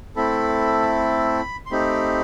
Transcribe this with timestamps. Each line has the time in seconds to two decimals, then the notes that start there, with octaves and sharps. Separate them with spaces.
0.16 A3 C4 E4 A4 B5
1.66 C6
1.71 A3 C4 D#4 G4 B5